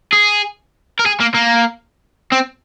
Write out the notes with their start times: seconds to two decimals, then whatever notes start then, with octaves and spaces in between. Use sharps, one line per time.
0.13 G#4
0.99 A#4
1.06 G#4
1.20 A#3
1.34 A#3
2.32 C4